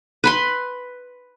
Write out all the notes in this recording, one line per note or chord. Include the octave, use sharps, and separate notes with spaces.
B4 B5 C6